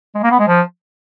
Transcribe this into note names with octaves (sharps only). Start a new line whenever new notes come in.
G#3
A#3
B3
G#3
F3